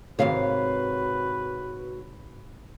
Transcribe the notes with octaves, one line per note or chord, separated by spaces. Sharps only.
G#2 C3 D#3 F#4 B4 C#5 F5